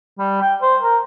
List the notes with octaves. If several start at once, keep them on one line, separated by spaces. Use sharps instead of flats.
G3
G5
C5
A#4